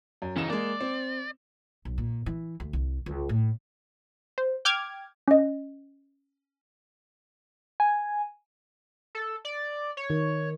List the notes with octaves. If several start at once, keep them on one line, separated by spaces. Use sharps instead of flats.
F#2
C#3 E3 D#4 E7
G#3 A#3 D5
C4
B1
A#2
E3
D2
C2
C#2
A2
C5
G5 D6 F6 G#6
C#4 D#5
G#5
A4
D5
C#5
D#3